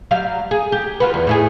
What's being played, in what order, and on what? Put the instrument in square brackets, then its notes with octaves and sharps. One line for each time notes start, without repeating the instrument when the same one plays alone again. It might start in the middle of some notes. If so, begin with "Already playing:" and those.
[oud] F#3 G3 F5
G#4
G4
F4 F#4 B4
E2
A2 E4 G#4